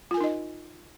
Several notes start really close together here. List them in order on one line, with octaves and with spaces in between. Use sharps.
F4 G#5 A#4 D#4 D#5